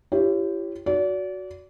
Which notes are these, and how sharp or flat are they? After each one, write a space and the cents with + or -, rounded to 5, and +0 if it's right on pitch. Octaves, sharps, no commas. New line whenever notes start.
E4 +40 G4 +0 C#5 +0
F#4 +0 D5 -35